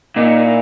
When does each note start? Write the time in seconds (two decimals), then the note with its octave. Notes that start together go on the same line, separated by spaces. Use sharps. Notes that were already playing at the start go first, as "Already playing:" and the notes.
0.16 A#2 D#4
0.45 E4